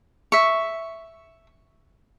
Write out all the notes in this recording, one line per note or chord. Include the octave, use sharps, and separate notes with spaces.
E5 C#6